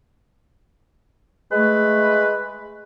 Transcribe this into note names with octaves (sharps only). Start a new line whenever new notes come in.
G#3 A3 B4